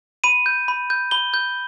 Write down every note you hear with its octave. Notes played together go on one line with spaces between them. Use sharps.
B5 D#7
G6
B5
G6
B5 G7
G6